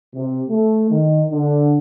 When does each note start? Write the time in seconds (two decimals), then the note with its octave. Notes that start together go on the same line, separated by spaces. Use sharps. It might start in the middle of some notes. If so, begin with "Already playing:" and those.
0.14 C3
0.49 A3
0.90 D#3
1.30 D3